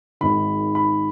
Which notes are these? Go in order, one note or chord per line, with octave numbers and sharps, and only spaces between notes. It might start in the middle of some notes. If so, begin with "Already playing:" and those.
G#1 G#2 D#3 B5
B5